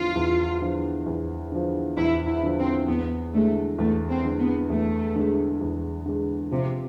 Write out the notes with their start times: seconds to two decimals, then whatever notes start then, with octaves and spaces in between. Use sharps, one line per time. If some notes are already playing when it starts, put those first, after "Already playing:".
Already playing: E2 D3 F3 F4
0.16 E2
0.61 D3 F3
1.06 E2
1.52 D3 F3
1.97 E2 E4
2.27 E4
2.43 D3 F3
2.58 C4
2.88 E2 B3
3.34 D3 G#3 A3
3.78 E2 A3
4.10 C4
4.25 D3 G#3
4.39 B3
4.70 E2 A3
5.16 D3 G#3
5.61 E2
6.06 D3 G#3
6.51 C3 F3